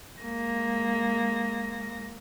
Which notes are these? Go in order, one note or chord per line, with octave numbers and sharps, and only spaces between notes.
G#3 A#3 A#6